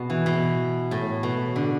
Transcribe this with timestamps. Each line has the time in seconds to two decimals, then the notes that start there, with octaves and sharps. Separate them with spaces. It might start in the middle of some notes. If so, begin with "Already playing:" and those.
Already playing: B2 B3
0.10 E3
0.26 B2
0.91 A2
1.23 B2
1.56 D3